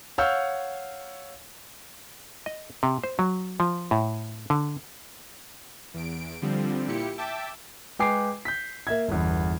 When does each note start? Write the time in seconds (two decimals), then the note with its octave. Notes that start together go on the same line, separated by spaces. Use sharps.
0.18 C#5 F5 F#5 E6 F6 G6
2.46 D#5
2.83 C3
3.04 C5
3.19 F#3
3.60 F3
3.91 A2
4.50 D3
5.94 E2 D7
6.42 D3 F3 G3 C4
6.88 A#2 E4 G4 C#7
7.18 E5 G5 A5 D6 E6
7.99 G#3 B4 G5 G#5 D6 C7
8.45 G6 B6
8.87 A#3 E5 G#6
9.08 G1 E2